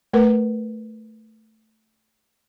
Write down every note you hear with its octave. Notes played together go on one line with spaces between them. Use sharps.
A3 A#4 B4